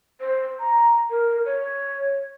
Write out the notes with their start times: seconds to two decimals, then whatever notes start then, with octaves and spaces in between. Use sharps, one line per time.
0.21 C5
0.60 A#5
1.10 A#4
1.45 C#5